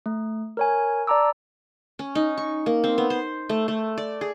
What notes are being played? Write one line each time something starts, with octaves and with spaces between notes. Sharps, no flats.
A3
A#4 C#5 G#5
D5 A5 A#5 D6 E6
C#4
D#4
C#6
A#3
C4
B3
C5
A3
A3
D5
G#4